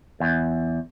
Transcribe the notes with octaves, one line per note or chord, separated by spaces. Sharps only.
E2